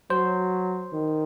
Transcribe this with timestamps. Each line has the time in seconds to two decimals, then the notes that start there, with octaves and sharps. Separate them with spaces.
0.10 F#3 C5
0.93 D#3